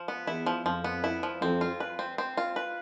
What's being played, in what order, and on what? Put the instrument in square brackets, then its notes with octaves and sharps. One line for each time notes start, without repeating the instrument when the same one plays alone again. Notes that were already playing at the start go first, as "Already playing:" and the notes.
Already playing: [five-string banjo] F3
B3
[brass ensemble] E2 [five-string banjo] E4
[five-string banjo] F3
[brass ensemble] F2 [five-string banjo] F3
[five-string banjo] B3
E4
F3
[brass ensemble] F2 [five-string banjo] C4
[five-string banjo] F4
B4
C4
C4
F4
B4